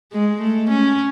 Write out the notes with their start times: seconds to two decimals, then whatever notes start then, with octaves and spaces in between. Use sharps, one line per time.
0.12 G#3
0.41 A3
0.69 C#4